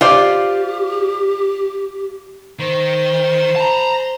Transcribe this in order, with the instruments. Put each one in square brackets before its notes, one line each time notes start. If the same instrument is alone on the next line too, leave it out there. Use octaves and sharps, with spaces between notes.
[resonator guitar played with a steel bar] F4 C5 D5 [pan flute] G4
[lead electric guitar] D#3 [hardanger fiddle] C5
[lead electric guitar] A5 A#5